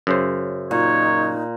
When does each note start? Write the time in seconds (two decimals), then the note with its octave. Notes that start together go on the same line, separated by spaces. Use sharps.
0.07 F#2 C#3 C5
0.71 A#2 D#4 C#5